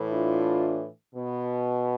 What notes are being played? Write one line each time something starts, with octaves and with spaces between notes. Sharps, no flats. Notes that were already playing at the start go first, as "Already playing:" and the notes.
Already playing: A2 E3
D4 F4
B2